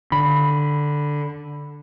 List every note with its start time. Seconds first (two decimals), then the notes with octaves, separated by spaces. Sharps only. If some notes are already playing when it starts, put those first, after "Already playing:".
0.12 D3 B5